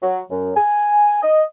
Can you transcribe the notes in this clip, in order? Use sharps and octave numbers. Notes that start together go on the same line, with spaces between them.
F#3
F#2
G#5
D#5